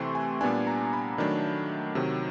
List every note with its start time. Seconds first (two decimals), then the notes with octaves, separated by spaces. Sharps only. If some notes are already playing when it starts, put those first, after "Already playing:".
Already playing: C3 E3 A3 C4 C6 C#6
0.15 G#5
0.41 A#2 G3 B3 D4 G#5
0.67 A#5
0.93 B5
1.18 D#3 F#3 A3 D4
1.95 C3 D#3 F#3